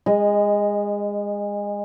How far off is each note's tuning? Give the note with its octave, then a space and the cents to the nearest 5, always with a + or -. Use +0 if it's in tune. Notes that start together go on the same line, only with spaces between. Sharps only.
G#3 -25 D#5 +0